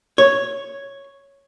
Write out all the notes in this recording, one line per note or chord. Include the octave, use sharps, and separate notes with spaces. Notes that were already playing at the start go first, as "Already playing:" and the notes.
C#5